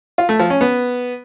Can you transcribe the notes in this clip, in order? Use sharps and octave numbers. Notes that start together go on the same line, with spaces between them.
F4
A3
F3
C#4
B3